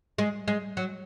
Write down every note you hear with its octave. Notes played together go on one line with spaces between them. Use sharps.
G#3
G#3
F#3